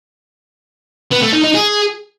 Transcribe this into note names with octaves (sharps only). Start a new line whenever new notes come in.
B3
A3
D#4
D#4
G#4